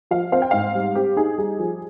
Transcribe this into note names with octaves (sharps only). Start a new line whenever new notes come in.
F3 F5
C4 F5
G5
G#2 F5
G3
C4 G4
D#4 G#4
G3 G#4
F3